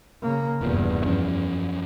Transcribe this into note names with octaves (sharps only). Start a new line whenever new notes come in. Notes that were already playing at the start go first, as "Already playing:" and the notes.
C#3 A#3
F1 E2 G2 A#2
F#2 F3 C#4